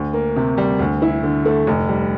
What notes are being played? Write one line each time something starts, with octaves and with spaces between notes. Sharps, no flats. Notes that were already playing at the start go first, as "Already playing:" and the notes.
Already playing: D2
A#3
C3
G3
D2
E4
D3
A3
F1
G3